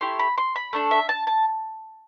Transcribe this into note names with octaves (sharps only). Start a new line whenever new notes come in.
A3 E4 G4 C6
B5
C6
B5
A3 D4 A4
E5
A5
A5